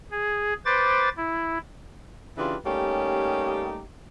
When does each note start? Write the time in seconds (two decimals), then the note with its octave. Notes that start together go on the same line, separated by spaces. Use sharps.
0.11 G#4
0.65 B4 C5 D6 A6
1.17 E4
2.37 C#3 E3 D4 F4 G4 B4
2.65 G3 A3 A#3 C#4 D#4 G4